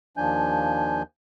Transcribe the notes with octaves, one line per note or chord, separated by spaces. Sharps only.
D#2 F3 D4 G#5 G6